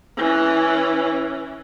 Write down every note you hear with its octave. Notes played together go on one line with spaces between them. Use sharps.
E3 C#4